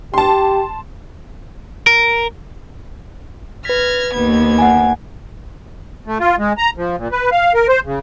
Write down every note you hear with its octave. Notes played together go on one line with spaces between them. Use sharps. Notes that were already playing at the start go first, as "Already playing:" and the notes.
G4 A5 C6
A#4
B4 F6 G#6 A#6 B6
D#2 B3 G#6
F#5 G#5
A3
F4
G#3
A#5
F3
A#2
B4
F5
A#4
C5
C#3